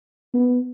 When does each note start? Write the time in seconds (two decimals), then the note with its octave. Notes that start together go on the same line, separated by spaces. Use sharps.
0.34 B3